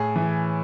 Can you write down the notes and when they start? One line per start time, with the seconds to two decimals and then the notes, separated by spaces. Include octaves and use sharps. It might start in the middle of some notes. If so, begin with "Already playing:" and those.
Already playing: A2 G#4
0.16 E3